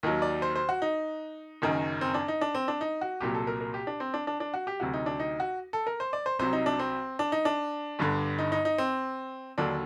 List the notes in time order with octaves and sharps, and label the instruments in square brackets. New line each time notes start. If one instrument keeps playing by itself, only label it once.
[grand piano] D#2 D#3 F#3
D5
C5
C5
F#4
D#4
F#1 F#2 D#3
C4
D4
D#4
D4
C4
D4
D#4
F#4
C2 A#2 F#3 G4
A4
A#4
A#4
G4
D4
C4
D4
D4
D4
F#4
G4
D2 C3 F#3 F#4
D#4
D4
D#4
F#4
A4
A#4
C5
D5
C5
C2 C3 F#3 C5
D#4
D4
C4
D4
D#4
D4
G1 G2 D3
D#4
D#4
D#4
C4
D#2 D3 F#3 D4